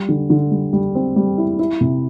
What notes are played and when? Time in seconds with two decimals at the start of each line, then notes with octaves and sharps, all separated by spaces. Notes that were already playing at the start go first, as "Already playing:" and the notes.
Already playing: G3
0.09 D3
0.30 D3
0.51 G3
0.73 G3
0.95 C4
1.16 G3
1.38 E4
1.59 E4
1.81 C3